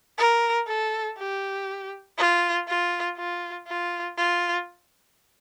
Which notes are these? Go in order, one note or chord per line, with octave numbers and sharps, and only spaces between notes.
A#4
A4
G4
F4
F4
F4
F4
F4